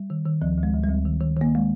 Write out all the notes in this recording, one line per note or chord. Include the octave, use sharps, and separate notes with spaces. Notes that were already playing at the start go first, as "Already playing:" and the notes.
Already playing: G3
D#3
D#3
D2 F3
D2
G#3
D2
G3
D2
D#3
D#3
D#3 A#3
G#3